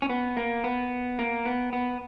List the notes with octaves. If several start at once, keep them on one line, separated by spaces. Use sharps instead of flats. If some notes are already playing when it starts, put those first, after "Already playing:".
C#4
B3
A#3
B3
A#3
B3
B3